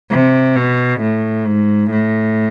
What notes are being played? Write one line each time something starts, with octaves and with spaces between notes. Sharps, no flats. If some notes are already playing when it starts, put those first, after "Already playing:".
C3
B2
A2
G#2
A2